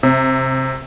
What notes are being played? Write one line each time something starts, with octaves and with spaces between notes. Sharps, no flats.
C3